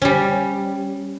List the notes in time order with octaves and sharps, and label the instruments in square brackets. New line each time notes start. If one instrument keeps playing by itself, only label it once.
[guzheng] G3 C#4